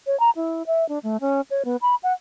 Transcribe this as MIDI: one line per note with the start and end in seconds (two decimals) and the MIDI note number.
0.07 0.18 73
0.20 0.30 82
0.36 0.63 64
0.67 0.87 76
0.89 0.99 62
1.03 1.20 57
1.21 1.41 61
1.51 1.63 73
1.65 1.77 59
1.82 1.95 83
2.03 2.13 78